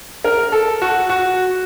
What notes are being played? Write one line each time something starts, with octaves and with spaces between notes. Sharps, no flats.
A#4
A4
F#4
F#4